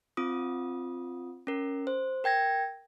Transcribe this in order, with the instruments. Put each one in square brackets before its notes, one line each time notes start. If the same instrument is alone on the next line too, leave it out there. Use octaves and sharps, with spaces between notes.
[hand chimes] C4 F4 D#6
C#4 A#4
C5
A#4 G5 G#6 A#6